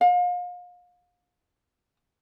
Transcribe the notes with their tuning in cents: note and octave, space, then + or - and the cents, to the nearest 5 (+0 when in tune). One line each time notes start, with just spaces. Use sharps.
F5 +35